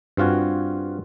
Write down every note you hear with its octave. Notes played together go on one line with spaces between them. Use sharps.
G2 C4 F4 F#4 G#5